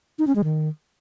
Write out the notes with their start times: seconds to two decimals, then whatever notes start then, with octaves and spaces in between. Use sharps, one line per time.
0.19 D#4
0.27 C#4
0.36 G#3
0.44 D#3